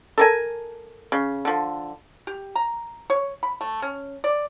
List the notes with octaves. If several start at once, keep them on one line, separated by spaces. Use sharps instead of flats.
A4 A#4 G#5
C#3
D3 F3
G4
A#5
C#5
B5
A3
C#4
D5